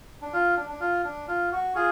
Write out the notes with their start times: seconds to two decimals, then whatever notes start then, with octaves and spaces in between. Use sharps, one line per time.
0.22 D4
0.33 F4
0.57 D4
0.69 D4
0.80 F4
1.05 D4
1.28 F4
1.52 F#4
1.75 F4 G#4